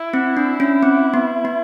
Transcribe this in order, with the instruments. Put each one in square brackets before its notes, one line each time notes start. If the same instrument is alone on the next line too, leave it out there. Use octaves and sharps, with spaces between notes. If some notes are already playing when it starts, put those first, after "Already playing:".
Already playing: [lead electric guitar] E4
[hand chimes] C4
D4
C#4
C4
B3
B3